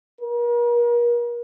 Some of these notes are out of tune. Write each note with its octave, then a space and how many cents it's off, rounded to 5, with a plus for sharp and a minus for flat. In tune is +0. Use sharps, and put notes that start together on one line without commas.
A#4 +40